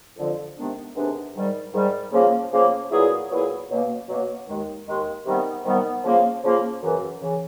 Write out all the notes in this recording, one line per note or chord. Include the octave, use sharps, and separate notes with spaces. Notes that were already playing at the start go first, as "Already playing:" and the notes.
F2 D3 F3
C3 D#3 G#3 B3 D4
C3 D#3 G#3 B3 D4
G#2 D#3 G3
G#2 D#3 G3
C#3 F3 A#3
C#3 F3 A#3
A#2 F#3 B3 E4 G#4
A#2 F#3 B3 E4 G#4
B2 F#3 A#3 C#4
B2 F#3 A#3 C#4
D#2 D#3 G#3
D#2 D#3 G#3
C3 D#3 G3 B3
C3 D#3 G3 B3
C#3 F3 A#3
C#3 F3 A#3
F#2 C#3 E3
C#3 E3